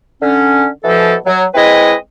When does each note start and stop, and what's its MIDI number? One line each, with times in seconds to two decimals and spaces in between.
0.22 0.67 50
0.22 0.67 61
0.84 1.14 47
0.84 1.14 52
0.84 1.14 53
0.84 1.14 69
1.26 1.44 54
1.55 1.95 56
1.55 1.95 60
1.55 1.95 64
1.55 1.95 71
1.55 1.95 75